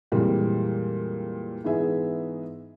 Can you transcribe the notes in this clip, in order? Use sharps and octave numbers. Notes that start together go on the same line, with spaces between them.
F2 A#2 E3 G3 G#3
G#2 E3 B3 G#4 E5